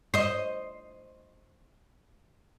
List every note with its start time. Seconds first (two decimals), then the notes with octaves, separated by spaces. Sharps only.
0.14 C5 D#5